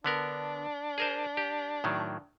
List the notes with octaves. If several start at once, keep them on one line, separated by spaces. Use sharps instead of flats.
D3 B3 D4 A#4
G#4 A#4 C5
G4
A2 D#3 F#3